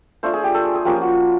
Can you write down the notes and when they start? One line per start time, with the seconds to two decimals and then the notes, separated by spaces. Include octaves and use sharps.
0.23 A3 D4 F4 C5
0.33 G#4
0.44 G4
0.54 A4
0.64 G#4
0.75 G#4
0.85 F3 A#3 C#4 F4 G4
1.01 F#4